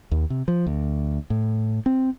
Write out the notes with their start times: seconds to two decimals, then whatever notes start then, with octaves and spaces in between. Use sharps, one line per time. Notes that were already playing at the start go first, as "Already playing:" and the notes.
0.11 D#2
0.30 C3
0.48 F3
0.66 D2
1.30 A2
1.86 C4